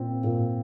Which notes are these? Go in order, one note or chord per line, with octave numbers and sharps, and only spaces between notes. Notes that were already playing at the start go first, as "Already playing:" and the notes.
Already playing: A#2 C4
A#2